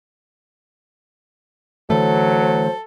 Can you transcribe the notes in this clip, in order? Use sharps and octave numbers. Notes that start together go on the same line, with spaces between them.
D3 E3 F#3 A3 A4 C5